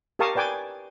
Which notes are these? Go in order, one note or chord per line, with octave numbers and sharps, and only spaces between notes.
G4 A#4 F5 A5 C#6 D#6
B4 D5 G5 G#5 D6